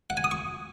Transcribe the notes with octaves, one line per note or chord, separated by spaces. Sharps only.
F#5
G#5
D#6
C#6